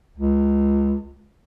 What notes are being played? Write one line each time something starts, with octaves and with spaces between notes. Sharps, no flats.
C#2